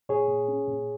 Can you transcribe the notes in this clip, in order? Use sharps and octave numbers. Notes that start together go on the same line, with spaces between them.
A#2 G#4 C#5
A#2
C#4
A#2